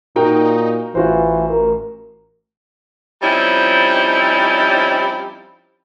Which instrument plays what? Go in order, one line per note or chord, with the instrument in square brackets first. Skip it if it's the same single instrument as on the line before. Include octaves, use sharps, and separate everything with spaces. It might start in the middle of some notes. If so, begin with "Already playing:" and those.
[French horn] A#2 [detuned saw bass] D#4 [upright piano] F#4 A#4 G5
[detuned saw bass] A1 [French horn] E3 [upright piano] F4 F#4 C5
[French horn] A#4
[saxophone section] F3 G3 C4 C#4 D#4 E4